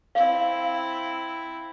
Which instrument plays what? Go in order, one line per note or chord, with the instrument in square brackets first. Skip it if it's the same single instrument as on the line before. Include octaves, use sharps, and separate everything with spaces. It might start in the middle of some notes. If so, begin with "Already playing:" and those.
[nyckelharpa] C4 E4 [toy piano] F5